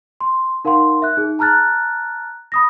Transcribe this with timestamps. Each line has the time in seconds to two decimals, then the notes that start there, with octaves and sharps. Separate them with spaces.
0.21 C6
0.65 D#4 A#4 F5 F#5 C6
1.02 E5 F#6
1.17 D#4 G#4
1.39 A5 A#5 F6 F#6 A6
2.52 B5 D#6 A#6